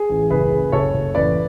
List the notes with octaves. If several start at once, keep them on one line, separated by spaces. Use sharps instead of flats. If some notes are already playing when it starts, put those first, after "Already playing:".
Already playing: G#4
A1
F#1 G#4 B4
F#1
F#1 A4 C#5
F#1
A1 B4 D5